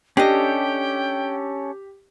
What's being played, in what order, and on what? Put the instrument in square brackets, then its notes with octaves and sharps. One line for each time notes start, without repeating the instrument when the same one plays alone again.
[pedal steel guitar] C#4 A4 [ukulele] D4 D#5 [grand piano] G4 [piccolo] G5